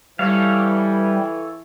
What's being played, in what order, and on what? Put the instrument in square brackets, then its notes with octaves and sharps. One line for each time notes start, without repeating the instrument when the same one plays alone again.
[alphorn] E3 [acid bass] G3 [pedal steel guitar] A4 C#5 F5